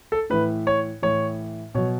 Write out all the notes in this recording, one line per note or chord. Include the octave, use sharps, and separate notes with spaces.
A4
A2 E3 B4
C#5
A2 E3 C#5
B2 F#3 C#5